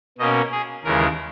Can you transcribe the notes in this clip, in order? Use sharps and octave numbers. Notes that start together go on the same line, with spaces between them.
B2 A#3 C#4 D#5
G#4
D#2 C#3 E3 G#3 A#4